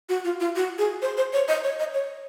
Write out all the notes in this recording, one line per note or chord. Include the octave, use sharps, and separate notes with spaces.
F#4
F4
F4
F#4
G#4
C5
C5
C#5
D#5
C#5
D#5
C#5